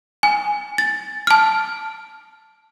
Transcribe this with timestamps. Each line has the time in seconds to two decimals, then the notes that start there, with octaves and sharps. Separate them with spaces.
0.23 G#5
0.78 A6
1.27 A5 F6